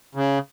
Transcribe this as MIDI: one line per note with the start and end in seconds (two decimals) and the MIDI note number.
0.15 0.39 49